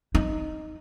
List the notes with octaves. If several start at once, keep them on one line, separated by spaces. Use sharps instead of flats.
D#4